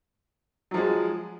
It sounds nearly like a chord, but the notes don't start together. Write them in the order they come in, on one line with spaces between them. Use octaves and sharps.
F#3 F3 G#3